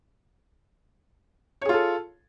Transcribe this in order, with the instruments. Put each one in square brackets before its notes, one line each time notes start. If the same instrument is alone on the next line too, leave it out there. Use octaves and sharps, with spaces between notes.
[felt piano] C#5
G#4
F4
A4